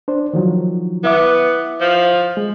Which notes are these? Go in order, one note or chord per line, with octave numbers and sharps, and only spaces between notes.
D4 C5
D#3 F3 F#3
B3 E4 E5 D6
F3
G#3